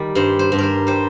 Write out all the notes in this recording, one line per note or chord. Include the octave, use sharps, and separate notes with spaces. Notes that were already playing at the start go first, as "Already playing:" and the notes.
Already playing: D#3 G3 D5
G2 C5
C5
G2
A#4 C5
G3 C5